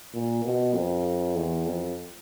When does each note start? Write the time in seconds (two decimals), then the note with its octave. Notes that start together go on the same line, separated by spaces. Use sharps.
0.14 A#2
0.44 B2
0.75 F2
1.36 E2
1.67 F2